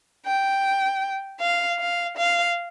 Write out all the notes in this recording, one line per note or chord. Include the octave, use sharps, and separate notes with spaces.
G5
F5
F5
F5